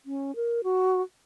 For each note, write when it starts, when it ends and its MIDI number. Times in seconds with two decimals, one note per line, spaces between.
0.06 0.35 61
0.36 0.61 70
0.64 1.01 66